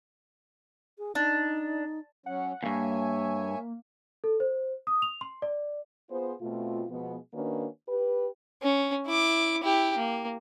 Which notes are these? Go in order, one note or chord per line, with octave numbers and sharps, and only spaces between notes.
G#4
D4 D#4
F#3 C#4 F#5
E2 G2 A#3 C#5 E5 G#5
A4
C5
D#6
F7
C6
D5
B3 F4 G#4 C5
B2 A3 C4 F4
B2 F3 G#3 B3
D#3 A#3 C#4 D4 F#4 B4
G4 B4
C#4
E4 D6
E4 G4
A#3